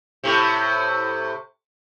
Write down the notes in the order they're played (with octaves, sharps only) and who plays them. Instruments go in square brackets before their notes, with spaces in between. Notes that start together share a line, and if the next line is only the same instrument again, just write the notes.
[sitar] A2 C3